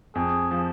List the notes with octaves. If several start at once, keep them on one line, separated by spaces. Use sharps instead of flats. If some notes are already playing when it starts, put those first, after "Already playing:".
F2 G#4
F3